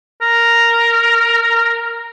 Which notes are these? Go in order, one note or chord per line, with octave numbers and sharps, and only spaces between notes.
A#4